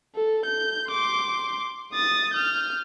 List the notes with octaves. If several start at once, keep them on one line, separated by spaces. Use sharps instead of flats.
A4
G6
C6 D6
D#6 A6
F6 G6